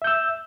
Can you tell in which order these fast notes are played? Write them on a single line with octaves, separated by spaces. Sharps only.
E5 G6 E6